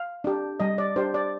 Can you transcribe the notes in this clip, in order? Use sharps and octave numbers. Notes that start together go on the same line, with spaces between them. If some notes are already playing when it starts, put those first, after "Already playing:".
Already playing: F5
D4 G4
G3 D#5
D5
D4 G4 C5
D5